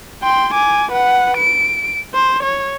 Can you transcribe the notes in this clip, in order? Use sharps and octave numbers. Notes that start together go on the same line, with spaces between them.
G5 C6
G#5 D6
B4 F#5
D7
C5
C#5